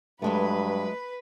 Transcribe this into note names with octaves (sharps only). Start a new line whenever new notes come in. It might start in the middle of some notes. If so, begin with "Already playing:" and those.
G2 F#3 G#3 A3 B4